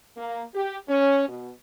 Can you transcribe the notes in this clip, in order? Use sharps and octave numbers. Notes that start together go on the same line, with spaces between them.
A#3
G4
C#4
B2